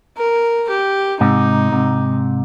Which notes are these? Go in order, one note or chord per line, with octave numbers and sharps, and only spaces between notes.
A#4
G4
G#2 C3 D#4
G#2 C3